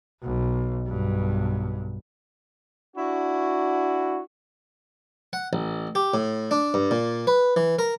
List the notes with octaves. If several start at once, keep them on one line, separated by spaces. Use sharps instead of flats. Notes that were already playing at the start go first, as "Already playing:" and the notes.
B1
B1 G2
D4 E4 F#4
F#5
A1
G4
A2
D4
G2
A#2
B4
E3
A#4